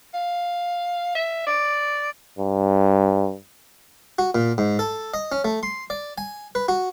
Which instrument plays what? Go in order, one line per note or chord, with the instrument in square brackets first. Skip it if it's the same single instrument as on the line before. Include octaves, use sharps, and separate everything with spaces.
[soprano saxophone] F5
E5
D5
[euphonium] G2
[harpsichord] F#4
A#2
G#2
A4
D#5
C#4
A3
C6
D5
G#5
B4
F#4